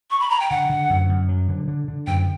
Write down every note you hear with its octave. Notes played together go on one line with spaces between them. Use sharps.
C#6
B5
A#5
G5
D3 F#5
D3
F#2
F#2
F#3
D3
D3
D3
F#2 G5